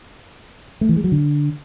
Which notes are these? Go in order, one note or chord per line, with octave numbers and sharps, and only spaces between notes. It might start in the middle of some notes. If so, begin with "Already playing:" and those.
A3
E3
G#3
F#3
D3